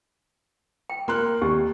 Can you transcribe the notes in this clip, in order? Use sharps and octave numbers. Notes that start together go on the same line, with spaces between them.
G5
A#3 C6 F#6
D#2 G4